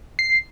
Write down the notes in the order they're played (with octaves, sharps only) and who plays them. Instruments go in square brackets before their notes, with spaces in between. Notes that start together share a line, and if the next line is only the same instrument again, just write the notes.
[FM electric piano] C7